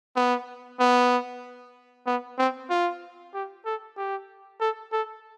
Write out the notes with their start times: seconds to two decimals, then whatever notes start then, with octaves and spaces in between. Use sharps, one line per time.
0.16 B3
0.80 B3
2.07 B3
2.39 C4
2.70 F4
3.34 G4
3.66 A4
3.97 G4
4.61 A4
4.92 A4